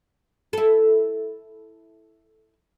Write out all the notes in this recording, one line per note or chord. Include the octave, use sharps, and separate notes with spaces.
E4 A4